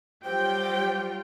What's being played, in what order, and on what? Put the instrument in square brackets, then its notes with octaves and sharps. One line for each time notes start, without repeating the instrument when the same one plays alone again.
[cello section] F#3 G3 F4 [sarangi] G4 [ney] C5 [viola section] G5